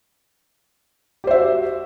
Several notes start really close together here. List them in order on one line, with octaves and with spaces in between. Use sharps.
G4 C5 E5 F#4